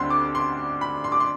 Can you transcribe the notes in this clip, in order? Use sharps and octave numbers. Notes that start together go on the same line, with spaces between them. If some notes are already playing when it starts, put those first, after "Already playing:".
Already playing: D2 D3 G3 C4 C6
D6
C6
B5
C6
D6
C6